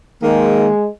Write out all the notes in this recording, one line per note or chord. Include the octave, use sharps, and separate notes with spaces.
D#3 G#3 A#3